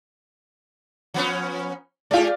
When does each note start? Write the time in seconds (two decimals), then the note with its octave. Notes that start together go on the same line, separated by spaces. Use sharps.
1.14 F3 B3 C#4
2.11 G#3 F4 G4 G#4 D5